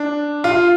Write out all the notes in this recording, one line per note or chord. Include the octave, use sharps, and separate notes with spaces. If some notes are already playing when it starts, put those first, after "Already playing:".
Already playing: D4
F4